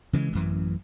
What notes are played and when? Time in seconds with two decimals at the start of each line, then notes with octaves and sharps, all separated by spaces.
0.13 C#3 E3 G3 G#3
0.33 A1 F#2 E3